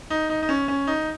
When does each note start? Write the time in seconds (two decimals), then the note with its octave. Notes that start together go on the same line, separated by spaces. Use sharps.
0.10 D#4
0.30 D#4
0.42 D#4
0.49 C#4
0.68 C#4
0.87 D#4